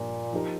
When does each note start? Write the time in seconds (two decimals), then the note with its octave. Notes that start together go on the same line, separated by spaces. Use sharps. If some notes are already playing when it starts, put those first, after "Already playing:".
Already playing: G2 A#2 F3 A#3
0.33 F3 D#4 G4 A#4